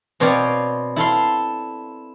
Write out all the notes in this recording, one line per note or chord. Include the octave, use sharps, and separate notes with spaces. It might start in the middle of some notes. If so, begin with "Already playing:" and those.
B2 C4 C#5 D5 F5
E4 A4 F5 C6